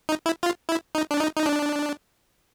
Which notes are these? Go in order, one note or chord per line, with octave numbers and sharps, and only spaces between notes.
D#4
E4
F4
E4
D#4
D4
D#4
D#4
D4